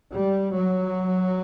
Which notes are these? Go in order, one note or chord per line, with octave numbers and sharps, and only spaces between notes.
G3
F#3